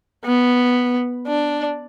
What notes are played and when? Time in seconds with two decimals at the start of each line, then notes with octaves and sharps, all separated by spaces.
0.25 B3
1.27 D4